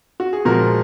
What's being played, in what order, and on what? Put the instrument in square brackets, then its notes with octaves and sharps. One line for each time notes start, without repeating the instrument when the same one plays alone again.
[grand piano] F#4
G#4
A#2 F3 G#3 F#4 A#4